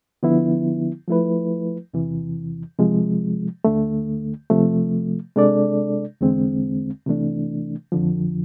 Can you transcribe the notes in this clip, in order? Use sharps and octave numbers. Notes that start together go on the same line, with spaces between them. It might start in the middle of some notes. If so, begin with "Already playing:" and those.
D3 F3 B3 E4
F3 A3 E4 B4
E2 C3 E3
C3 F3 G#3
D2 D3 A3
C3 F3 A3
C3 G#3 D4 A4 D5
E2 D3 G#3 C4
C3 E3 A3 D4
F2 D3 F3